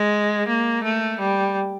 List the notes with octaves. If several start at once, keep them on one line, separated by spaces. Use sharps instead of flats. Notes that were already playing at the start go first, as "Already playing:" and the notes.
Already playing: G#3
A#3
A3
G3